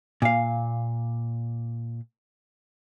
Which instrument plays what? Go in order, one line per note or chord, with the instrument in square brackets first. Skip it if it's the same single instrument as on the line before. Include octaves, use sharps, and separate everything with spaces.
[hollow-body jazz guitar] A#2 F5